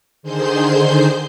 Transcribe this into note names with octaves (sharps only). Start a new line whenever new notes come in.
D3 D#3 G#4 C5 C6 G6